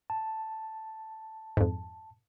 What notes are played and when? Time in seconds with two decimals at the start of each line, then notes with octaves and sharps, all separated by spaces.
0.10 A5
1.57 F2 G#2